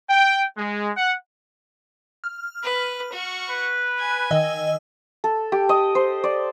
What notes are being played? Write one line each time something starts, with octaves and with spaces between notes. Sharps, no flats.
G5
G#3
F#5
F6
B4
F#4 C#6
B4
G#5
D#3 D#5 E6
A4
G4
D#5
C5
D5